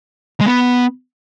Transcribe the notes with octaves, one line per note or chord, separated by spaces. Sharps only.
G#3
B3